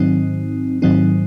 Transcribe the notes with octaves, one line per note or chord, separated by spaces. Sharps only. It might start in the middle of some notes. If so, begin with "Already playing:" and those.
Already playing: G#2 D#3 F#3 C4 D#4
G#2 D#3 F#3 C4 D#4